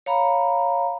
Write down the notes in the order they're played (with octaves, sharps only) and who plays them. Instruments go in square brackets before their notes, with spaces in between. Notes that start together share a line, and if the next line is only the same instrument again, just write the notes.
[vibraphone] C#5 F5 A#5 B5